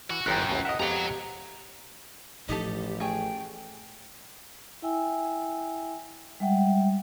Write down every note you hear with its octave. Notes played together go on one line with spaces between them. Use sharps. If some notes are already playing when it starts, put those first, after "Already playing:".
E3 F#4
G1 F#2 D#3 E3 G5 A#5 F#6
A1 D#2 A2
A#4 D#5 E5 F#5
F2 G#3 B3 G4 F#5 A#5
A1 A2 F3 D#4 G4 A4
A3 G#4 G5
E4 E5 G5 G#5 E6
G3 G#3 E5 F#5 G5